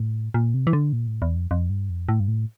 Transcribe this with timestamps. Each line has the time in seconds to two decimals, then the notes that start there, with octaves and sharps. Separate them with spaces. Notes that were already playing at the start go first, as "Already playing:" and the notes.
Already playing: A2
0.34 A#2
0.54 C3
0.67 E3
0.73 D3
0.93 A#2
1.07 A2
1.22 E2
1.36 F2
1.51 F2
1.70 G2
1.90 F2
2.09 A2
2.20 G2
2.28 A2